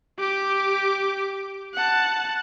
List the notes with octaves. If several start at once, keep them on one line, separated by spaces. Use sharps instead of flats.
G4 D6
F#5 A5